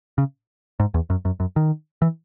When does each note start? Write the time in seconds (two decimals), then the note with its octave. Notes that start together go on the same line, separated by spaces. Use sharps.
0.18 C#3
0.80 G#2
0.94 E2
1.10 F#2
1.25 F#2
1.40 F#2
1.56 D#3
2.02 E3